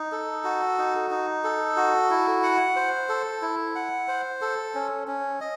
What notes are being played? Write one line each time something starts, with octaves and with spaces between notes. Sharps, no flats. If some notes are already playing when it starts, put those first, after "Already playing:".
Already playing: D#4
A4
F#4
D#4
D#4
A4
F#4
E4
F#5
C5
A4
E4
F#5
C5
A4
C#4
C#4
D#5